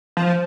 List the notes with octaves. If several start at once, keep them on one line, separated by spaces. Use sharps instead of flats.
F3